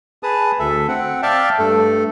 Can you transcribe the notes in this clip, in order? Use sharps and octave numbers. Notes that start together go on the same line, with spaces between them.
G#4 B4 A5 D#6
D2 A4 E5
C4 F#5
D5 E5 F5 G5 A5
G2 A3 A4